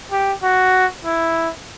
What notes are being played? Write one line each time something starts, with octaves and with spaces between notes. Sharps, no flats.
G4
F#4
E4